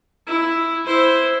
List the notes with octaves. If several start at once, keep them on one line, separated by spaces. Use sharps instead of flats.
E4
E4 C5